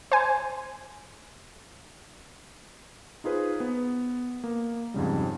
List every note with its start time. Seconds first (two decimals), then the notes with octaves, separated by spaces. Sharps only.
0.12 C5 G#5
3.24 D#4 F4 G#4 B4 C5
3.60 B3
4.44 A#3
4.94 F2 G#2 C#3 G3